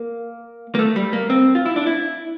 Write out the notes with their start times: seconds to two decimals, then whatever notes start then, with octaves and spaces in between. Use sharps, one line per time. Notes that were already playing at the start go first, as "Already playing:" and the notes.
Already playing: A#3
0.75 A#3
0.79 A3
0.96 G3
1.13 A#3
1.30 C4
1.55 F4
1.66 E4
1.76 D4
1.87 E4